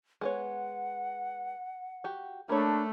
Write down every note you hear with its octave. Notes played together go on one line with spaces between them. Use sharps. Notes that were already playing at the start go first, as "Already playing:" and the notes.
G#3 B3 C#5 F#5
F#4 G4
A3 A#3 D4 C#5 A5 B5